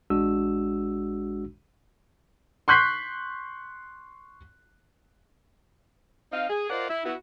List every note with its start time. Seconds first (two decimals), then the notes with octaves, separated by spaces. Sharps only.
0.10 A1 G#3 D4 F#4 E6
2.68 C6 C#6 F#6 G6 B6 C7
6.32 C4 D#4 D#5 F5
6.49 G#4
6.70 F4 A#4 C5 D5 D#5 F#5
6.89 E4
7.05 B3 E4 F#4